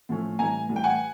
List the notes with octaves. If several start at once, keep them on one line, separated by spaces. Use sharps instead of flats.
A2 F3 A3 C#4
A2 E3 G3 G#5 A#5
A2 E3 G3
G5
F#5 G#5